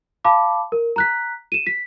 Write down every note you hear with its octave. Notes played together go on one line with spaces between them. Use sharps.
F5 A5 B5 D6
A#4
A#5 F#6 B6
D#7 E7
B6